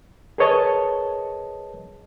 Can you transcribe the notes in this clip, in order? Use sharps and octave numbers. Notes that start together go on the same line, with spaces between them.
G#4 A#4 B4 C#5 D#5 A5